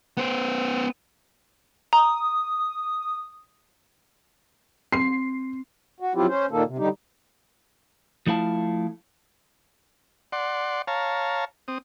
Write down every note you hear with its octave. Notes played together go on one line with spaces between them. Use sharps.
B3 C5
A#5 D#6
C4 C7
F#4
F3 F#3 C4 E4 F4 G4
C#4 C5
A#2 D#3 A#3 A4
C3
D3 G3 D#4 G4
F3 A3 E4 F5 A5
D5 F#5 C6
C#5 F5 A5 A#5
C4 D#6